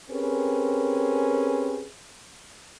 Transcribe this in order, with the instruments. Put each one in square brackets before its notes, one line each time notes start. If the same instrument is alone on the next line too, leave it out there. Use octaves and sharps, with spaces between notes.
[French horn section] C4 C#4 G4 G#4 A#4 B4